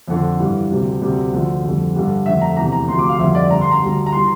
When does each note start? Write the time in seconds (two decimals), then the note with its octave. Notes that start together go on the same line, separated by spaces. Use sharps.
0.08 F2 D3 F3
0.39 G2 E3 G3
0.70 D2 C3 G3
1.01 D2 C3 G3
1.33 D2 D3 F3 A3
1.63 F2 D3 G3
1.95 G2 D3 G3
2.26 F2 D3 A3 E5
2.41 A#5
2.57 E2 C3 E3 A3 A#5
2.72 A#5
2.88 D2 C3 F3 A3 C6
2.99 D6
3.09 F5
3.19 F2 D3 G3 E5
3.35 D5
3.50 G2 D3 G3 A#5
3.61 C6
3.71 A#5
3.82 D2 D3 G3
4.06 A#5
4.12 E3 G3 C6